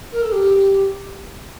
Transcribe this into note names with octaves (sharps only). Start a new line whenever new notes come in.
A#4
A4
G4